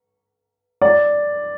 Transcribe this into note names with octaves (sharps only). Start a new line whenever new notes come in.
D5